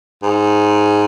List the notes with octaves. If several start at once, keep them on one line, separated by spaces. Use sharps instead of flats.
G#2